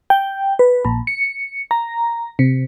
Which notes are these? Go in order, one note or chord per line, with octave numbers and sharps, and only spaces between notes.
G5
B4
A#1
C#7
A#5
C3